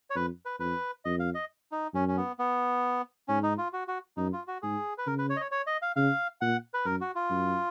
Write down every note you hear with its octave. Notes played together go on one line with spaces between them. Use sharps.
C#5
F2 B4
B4
F2 B4
F2 D#5
F5
D#5
D#4
F#2 C#4
C#4
B3
B3
G#2 C#4
D#4
F4
F#4
F#4
F#2 D#4
F4
F#4
G#2 G#4
B4
C#3 A#4
B4
C#5
D#5
C#5
C#5
D#5
F5
C#3 F5
A#2 F#5
B4
F#2 A#4
F#4
F4
F#2